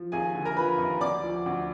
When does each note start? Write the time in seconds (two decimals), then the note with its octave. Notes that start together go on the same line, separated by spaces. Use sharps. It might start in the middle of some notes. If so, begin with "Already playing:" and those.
Already playing: F3
0.12 D#2 G#4 G#5
0.35 D3
0.45 A#4 A#5
0.56 F3 B4 B5
0.78 D#2
1.00 D2 D5 D6
1.22 F3
1.46 D2